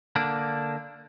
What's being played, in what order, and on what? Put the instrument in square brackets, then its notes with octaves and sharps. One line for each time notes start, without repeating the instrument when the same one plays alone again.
[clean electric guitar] D3 A#3 D4